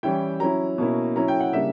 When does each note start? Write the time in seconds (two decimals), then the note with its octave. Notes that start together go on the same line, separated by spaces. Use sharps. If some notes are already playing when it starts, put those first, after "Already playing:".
0.03 E3 G3 C#4 E4 G5
0.40 F#3 C#4 E4 A#5
0.78 B2 A#3 C#4 E4
1.16 F#3 C#4 E4 A#5
1.28 G5
1.40 F#5
1.53 C#3 G3 A#3 D4 E5